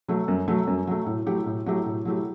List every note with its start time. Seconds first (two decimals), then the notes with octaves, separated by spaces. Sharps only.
0.08 F#3 A3
0.28 F#2
0.48 F#3 A3
0.67 F#2
0.87 F#3 A3
1.06 A2
1.27 F#3 A3 E4 G4
1.46 A2
1.66 F#3 A3 E4 G4
1.86 A2
2.05 F#3 A3 E4 G4